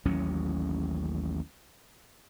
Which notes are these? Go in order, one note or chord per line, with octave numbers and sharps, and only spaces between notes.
A1 D#2 F#3 C#4